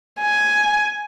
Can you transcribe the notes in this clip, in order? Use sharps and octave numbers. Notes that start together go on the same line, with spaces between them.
G#5